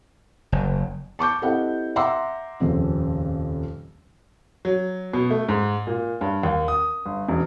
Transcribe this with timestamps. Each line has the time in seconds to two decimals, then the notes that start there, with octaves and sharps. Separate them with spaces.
0.52 F#1
1.19 A5 C#6 D6 G6
1.42 C4 E4 G4 A4 D#5 F#5
1.96 E5 F#5 A#5 C6 D6 E6
2.60 D#1 F2 C#3
4.65 F#3
5.13 B2
5.31 A3
5.49 G#2
5.87 A#2
6.21 G2
6.43 D#2
6.68 D#6
7.05 G1
7.28 E1